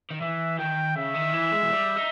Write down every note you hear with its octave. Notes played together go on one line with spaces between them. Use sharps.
D#3
E3 E5
D#3 G5
C#3 E5
D#3
E3
G#3
E3
G3
D#4